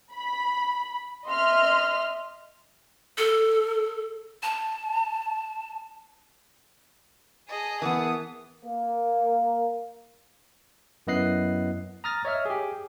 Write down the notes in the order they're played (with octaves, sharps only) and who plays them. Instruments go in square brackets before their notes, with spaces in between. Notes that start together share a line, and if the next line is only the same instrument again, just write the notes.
[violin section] B5
D#5 E5 C6 F6
[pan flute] A4
A5
[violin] G#4 A5 [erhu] D#5
[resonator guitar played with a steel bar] E3 B3 [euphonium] A#4 [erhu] D#6
[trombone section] A#3
[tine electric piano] F#2 B3 E4 D#5 F#6 C7
A#5 D#6 F6 A6 A#6
C#5 D#5 E5 F6
G4 G#4